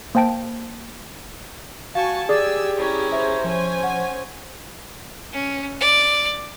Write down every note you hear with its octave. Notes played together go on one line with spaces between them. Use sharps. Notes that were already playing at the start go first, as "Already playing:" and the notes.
A#3 C5 G5 A5 D7
F#4 F5 G#5 A5 C#6
G4 G#4 D5 G#5 D6 E6 A6
C#4 E4 A#4
C5 E5
F3 C#4 G#5
F#5
C#4
D5